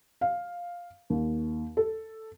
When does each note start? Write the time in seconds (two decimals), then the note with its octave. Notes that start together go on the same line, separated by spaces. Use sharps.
0.21 F5
1.10 D#2
1.77 A4